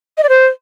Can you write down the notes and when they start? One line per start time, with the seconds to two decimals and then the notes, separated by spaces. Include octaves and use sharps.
0.18 D#5
0.23 D5
0.29 C5